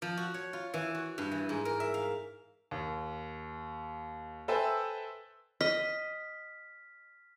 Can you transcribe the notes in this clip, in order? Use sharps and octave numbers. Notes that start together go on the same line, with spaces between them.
F3
F#4
C#5
F4
E3
F#4
G2
E3
G#2
A#4
E5
F5
D#2
A4 B4 C5 E5 G5 G#5
D#5 F6 B6